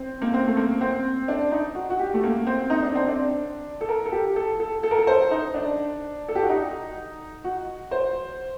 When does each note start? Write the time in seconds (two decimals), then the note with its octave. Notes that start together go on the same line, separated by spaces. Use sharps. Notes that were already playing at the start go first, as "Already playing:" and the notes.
Already playing: C4
0.22 A#3
0.34 C4
0.47 A3
0.57 A#3
0.81 C4
1.28 D4
1.52 D#4
1.75 F#4
1.90 F#4
1.99 G4
2.14 A3
2.23 A#3
2.47 C4
2.70 D#4
2.83 D4
2.95 C4
3.07 D4
3.81 A4
3.89 A#4
4.06 A4
4.12 G4
4.36 A4
4.60 A4
4.83 A4
4.91 A#4
4.98 A4
5.07 C5
5.31 D#4
5.54 D4
6.28 A4
6.35 G4
6.43 F#4
6.49 D#4
7.44 F#4
7.91 C5